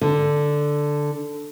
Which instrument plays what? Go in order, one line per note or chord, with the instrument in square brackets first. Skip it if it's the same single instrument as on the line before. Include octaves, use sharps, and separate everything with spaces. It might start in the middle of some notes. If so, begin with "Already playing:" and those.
[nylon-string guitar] D3